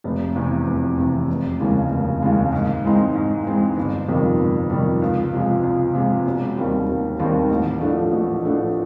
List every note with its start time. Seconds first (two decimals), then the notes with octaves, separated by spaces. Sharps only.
0.04 F1
0.36 E2 C3 E3
0.67 F1
0.97 E2 C3 E3
1.29 F1
1.60 D#2 C#3 E3 G#3
1.90 F1
2.22 D#2 C#3 E3 G#3
2.53 G#2
2.84 E3 G#3 C4 D#4
3.15 G#2
3.46 E3 G#3 C4 D#4
3.77 G1
4.08 F2 C3 D#3 G3
4.40 G1
4.70 F2 C3 D#3 G3
5.02 C#2
5.33 C3 F3 G#3
5.63 C#2
5.94 C3 F3 G#3
6.26 E1
6.57 D#2 D#3 G3 C4
6.88 E1
7.19 D#2 D#3 G3 C4
7.50 A1
7.81 A2 F3 A3 D4
8.12 A1
8.43 A2 F3 A3 D4